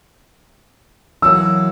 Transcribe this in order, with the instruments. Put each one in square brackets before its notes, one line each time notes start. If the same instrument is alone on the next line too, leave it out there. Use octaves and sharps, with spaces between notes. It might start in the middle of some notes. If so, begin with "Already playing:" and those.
[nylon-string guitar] E3 F#3 A#3 [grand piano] E6